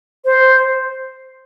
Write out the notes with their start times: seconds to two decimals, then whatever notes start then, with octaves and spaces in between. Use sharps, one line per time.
0.25 C5